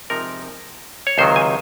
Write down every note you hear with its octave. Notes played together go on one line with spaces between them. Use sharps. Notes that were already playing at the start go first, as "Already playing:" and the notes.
C3 F3 G#3 D#4 A#4
C#5
C#2 C3 D#3 F#3 C5
G#5